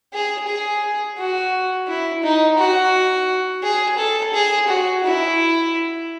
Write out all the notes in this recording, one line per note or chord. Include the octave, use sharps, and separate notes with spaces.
G#4
G#4
F#4
E4
D#4
F#4
G#4
A4
G#4
F#4
E4